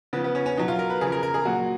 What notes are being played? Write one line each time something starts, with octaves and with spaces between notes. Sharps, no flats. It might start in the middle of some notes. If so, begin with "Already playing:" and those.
C#3 F3 B3
B3
C#4
C#4
B2 F#3 D#4
F4
A#4
B4
C#3 F3 G#4
A#4
A#4
G#4
A#2 F#3 F#4